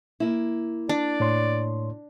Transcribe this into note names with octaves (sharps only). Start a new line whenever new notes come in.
A#3 E4
D4 D5
A2 C#5 C6